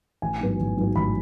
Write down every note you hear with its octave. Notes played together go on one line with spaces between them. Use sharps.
A1 G#5
G#2 F#3 B3
A1
G#2 F#3 B3
A1 B5